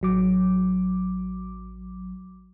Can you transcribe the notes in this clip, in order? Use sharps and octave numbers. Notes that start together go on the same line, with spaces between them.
A1 F#3 D6